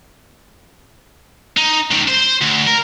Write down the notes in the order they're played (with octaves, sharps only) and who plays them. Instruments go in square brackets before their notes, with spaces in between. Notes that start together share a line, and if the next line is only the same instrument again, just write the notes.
[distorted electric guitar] D#4
C#2 D#3
C5
D2
A#4